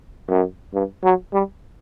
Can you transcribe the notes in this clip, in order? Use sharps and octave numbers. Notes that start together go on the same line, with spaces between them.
F#2
G2
F#3
G3